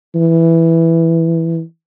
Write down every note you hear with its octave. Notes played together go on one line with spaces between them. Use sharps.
E3